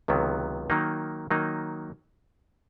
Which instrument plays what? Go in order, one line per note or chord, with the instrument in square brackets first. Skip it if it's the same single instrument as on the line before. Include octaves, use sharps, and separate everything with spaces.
[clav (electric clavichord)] C#2 C3 D#3 F#3 B3
D#3 F#3 A#3 D#4
D#3 F#3 A#3 D#4